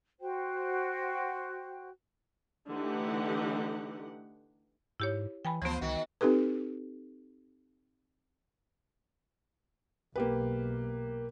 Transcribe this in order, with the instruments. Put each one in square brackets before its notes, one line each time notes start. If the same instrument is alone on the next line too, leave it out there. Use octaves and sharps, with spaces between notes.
[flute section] F#4 C5 G5
[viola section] D3 E3 A3 D#4 G4 F#5
[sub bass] G#2 [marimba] E4 G4 C#5
[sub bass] E3 [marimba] G5 G#5 B5
[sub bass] D2 [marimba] E3 B3 [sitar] F3 C5
[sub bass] C2 [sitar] D#3 F#4
[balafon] C4 D#4 G4 A4 B4
[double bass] B1 [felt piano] A#3 G4 B4